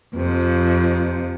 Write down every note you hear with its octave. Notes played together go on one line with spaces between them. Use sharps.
F2 C3 F3